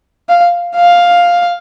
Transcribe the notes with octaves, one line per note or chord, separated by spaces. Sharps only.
F5
F5